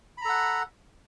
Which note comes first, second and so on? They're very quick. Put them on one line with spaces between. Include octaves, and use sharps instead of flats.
B5 A#5 A4 F#5